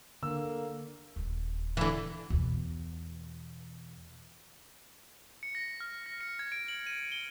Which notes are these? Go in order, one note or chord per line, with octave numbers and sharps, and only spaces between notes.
D3 A#3 E6
D#1 E2
D3 E3
E2 B2
C#7
A#6
F6
A#6
C#7
G#6
D7
F#7
D#7
G7